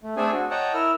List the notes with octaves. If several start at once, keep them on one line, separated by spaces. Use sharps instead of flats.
A3
A3 C4 D4 G#4 A4 G#5
F#4
C#5 D#5 F#5 G5 A5 A#5
E4 A#4 E6 F6